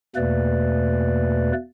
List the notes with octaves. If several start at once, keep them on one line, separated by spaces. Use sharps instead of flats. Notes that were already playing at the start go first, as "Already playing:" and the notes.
E2 B2 A3 A#3 B4 D5